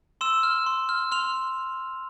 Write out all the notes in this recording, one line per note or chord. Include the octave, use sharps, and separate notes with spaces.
C6 E6 E7
F6
C6
F6
C6 F6 F7